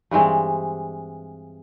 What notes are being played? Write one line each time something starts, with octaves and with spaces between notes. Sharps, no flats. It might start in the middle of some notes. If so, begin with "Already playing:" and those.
G2 E3 G#3 C4